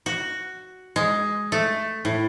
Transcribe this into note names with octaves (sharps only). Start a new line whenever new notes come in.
F#4
G#3
A3
A2